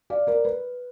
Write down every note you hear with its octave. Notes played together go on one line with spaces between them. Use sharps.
D5 F5
A#4 D5
B4